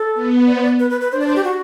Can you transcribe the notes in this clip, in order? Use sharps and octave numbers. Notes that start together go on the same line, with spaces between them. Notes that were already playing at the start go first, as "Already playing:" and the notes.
Already playing: A4
B3
D5
C5
D5
B4
B4
B4
D4 C5
D5
C5
G4
F#4